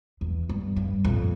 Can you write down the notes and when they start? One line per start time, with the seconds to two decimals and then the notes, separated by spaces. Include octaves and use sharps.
0.21 E2
0.49 G2
0.76 G2
1.05 F2 A#2